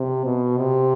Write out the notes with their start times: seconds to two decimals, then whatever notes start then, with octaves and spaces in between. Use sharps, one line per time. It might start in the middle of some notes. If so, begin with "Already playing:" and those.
Already playing: C3
0.25 B2
0.58 C3